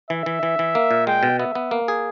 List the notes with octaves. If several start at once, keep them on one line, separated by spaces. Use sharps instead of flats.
E3 E5
E3
E3
E3
A#3
A#2
G#3 G5
B2
B3 E5
B3
A#3
G#4